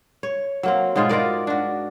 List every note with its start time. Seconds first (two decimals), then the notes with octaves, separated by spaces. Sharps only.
0.23 C#5
0.63 F#3 A#3 C4
0.96 G#2 B2 G#3 F4
1.09 F4 F#4 A#4 D5
1.47 D4 F#4